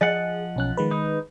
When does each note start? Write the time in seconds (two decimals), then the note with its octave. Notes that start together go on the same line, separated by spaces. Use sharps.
0.01 F3 G#4 D#5 F#5
0.56 B1 C#4 F#6
0.77 D#3 G#3 B4
0.91 D#4